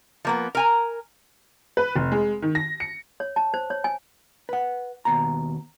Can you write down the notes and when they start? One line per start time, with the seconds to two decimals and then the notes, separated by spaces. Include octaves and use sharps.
0.25 F3 A#3 B3
0.55 A#4 G#5 A#5
1.77 B4
1.96 F1
2.12 G#3
2.42 D#3
2.55 A#6
2.80 C#7
3.20 C#5
3.36 A5
3.54 C5
3.70 C#5
3.84 G#5
4.49 B4 F#5
5.05 D#2 B2 A#5